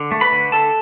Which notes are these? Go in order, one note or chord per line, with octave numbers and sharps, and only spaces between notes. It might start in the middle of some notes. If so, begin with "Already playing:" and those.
Already playing: D3
A3
B4 B5
D3
D3 A4 A5